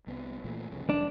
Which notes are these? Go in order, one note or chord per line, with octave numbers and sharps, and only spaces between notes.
C2 B3 C4
A#2 E3 A3
C2 F2 C#3
F1 D4